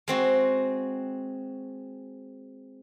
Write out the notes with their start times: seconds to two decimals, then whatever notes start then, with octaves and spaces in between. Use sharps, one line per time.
0.08 G#3 C4 F#4